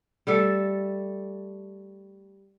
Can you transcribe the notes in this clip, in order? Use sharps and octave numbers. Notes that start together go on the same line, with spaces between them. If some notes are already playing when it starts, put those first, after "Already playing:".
G3 A3 A4